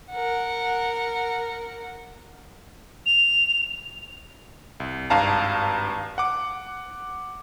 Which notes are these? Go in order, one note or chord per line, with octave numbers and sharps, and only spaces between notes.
A#4 F#5
F7
C2
G#1 G2 F5 A5 A#5
F#5 D6